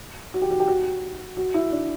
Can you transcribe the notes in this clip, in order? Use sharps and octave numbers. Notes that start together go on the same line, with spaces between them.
F#4
G4
F#4
G4
F#4
F#4
E4
D4